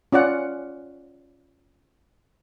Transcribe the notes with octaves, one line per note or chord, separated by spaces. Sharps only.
C#4 F4 D5 F#5